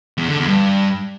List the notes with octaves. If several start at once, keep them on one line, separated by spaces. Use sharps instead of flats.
E2
D3
E2
G2